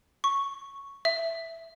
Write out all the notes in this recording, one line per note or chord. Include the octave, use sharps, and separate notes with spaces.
C#6
E5